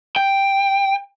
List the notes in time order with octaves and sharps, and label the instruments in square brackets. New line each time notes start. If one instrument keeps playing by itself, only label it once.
[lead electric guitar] G5